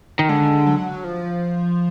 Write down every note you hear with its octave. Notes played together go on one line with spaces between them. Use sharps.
D#3
D3 G#3
F#3
F3